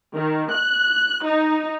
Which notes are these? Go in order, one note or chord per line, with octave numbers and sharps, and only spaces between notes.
D#3
F#6
D#4